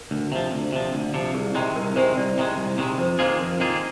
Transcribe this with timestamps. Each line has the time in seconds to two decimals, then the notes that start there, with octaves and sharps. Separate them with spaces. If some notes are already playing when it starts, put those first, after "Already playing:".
Already playing: A#4
0.11 D2
0.32 C3 F3
0.52 D2
0.73 C3 F3
0.94 D2
1.14 C3 F3
1.34 C2 G#4
1.55 C3 D#3 G#3
1.75 C2 A#4
1.96 C3 D#3 G#3 C5
2.17 C2 D5
2.38 C3 D#3 G#3
2.58 C2
2.78 C3 D#3 G#3
2.98 F2 C5
3.19 D#3 A#3 F4 G#4 C5
3.40 F2 A#4
3.60 D#3 A#3 F4 G#4